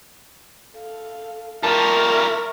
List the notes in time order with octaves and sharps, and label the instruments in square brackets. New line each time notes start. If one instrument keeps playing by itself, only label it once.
[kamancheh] A4 F5
[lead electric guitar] G3 F4 [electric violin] A#4 [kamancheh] E5 C#6 [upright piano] A5